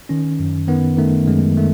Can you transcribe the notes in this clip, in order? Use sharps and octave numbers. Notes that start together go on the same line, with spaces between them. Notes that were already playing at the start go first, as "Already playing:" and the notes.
D#3 C#4
F#2
D#3 B3
D#3 A3
F#2 G#3
D#3 A3